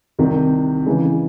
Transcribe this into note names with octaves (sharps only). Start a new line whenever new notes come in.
C2 C3 D#3
C#3 E3 G#3